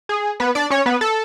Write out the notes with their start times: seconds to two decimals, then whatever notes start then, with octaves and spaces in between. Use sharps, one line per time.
0.09 G#4
0.40 B3 B4
0.55 D4 D5
0.70 C#4 C#5
0.86 B3 B4
1.01 A4